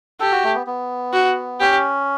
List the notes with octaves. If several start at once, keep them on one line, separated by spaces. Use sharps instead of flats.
G4 A4
F#4
A3
B3
B3
F#4
C#4 G4